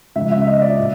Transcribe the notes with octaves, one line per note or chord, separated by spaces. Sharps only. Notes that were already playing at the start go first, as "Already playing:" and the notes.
C#2 C#3 F3 E5
E5
D#5
D5
A#2